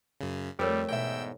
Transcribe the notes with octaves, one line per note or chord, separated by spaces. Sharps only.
F#2 C#3
F2 G3 A3 G4 G#4 A#4 C#5
E2 G#2 B2 E5 G5 E6